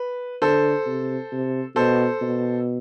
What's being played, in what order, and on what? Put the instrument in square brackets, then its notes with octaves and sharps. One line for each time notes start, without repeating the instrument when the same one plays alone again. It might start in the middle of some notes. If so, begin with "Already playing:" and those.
Already playing: [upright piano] B4
[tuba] D3 [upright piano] A4 C5
[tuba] C3
C3
[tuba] B2 [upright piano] A4 C5
[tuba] B2